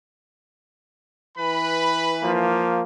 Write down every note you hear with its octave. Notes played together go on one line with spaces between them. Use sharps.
E3 B4 B5
F3 A#3